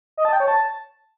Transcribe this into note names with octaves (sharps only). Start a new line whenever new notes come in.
D#5
A5
G5
C#5
A5